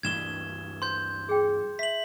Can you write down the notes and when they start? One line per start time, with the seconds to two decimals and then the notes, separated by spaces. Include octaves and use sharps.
0.03 D2 G2 E3 G#6 E7 G7
0.82 C5 C6 G6
1.29 G#4 G5
1.79 E5 B6 F#7